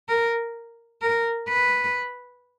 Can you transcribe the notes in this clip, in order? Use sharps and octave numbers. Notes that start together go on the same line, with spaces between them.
A#4
A#4
B4